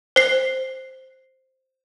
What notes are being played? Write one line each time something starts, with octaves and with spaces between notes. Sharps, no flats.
C5 C7